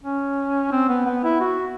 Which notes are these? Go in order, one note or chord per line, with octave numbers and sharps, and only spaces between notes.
C#4
C4
B3
B3
E4
F#4